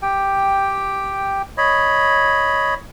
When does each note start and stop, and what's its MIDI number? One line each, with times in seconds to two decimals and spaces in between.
0.02 1.42 67
0.02 1.42 79
1.58 2.74 73
1.58 2.74 75
1.58 2.74 83